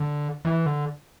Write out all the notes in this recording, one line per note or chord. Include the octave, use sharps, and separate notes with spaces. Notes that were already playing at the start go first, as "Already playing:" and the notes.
Already playing: D3
E3
D3